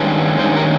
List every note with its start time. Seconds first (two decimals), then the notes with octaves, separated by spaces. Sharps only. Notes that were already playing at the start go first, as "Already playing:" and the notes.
Already playing: G2 D#3 G#3 C#4
0.38 G2 D#3 C#4 C5
0.56 G4 A#4